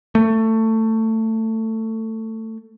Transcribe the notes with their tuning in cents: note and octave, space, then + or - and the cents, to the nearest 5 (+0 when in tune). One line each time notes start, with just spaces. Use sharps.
A3 +20